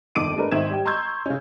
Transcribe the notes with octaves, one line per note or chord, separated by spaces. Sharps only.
G1 F2 D#3 D6 D7 D#7
G#3 A3 D4 A#4 B4
G#1 D#3 C5 E5 G#6 E7
G3 G4 G5
A#5 C6 C#6 E6 G6 G#6
C#3 C#4